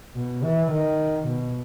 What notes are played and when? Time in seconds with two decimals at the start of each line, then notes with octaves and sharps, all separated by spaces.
0.15 B2
0.44 E3
0.72 D#3
1.28 B2